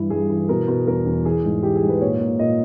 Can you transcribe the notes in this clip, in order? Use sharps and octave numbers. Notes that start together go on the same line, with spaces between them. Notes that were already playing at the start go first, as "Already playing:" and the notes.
Already playing: G2 E3 E4
G2 G#4
E3
B2 A#4
B2
E2 A#4
E2
E3 G#4
G#2
E3 G4
G#4
G#2
B4
A#2 C#5
A#2
A#2 D#5